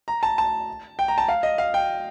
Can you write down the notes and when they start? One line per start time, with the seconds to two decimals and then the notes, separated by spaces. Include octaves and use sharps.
0.08 A#5
0.23 A5
0.38 A5
0.99 G5
1.08 A#5
1.18 A5
1.28 F5
1.43 D#5
1.58 F5
1.74 G5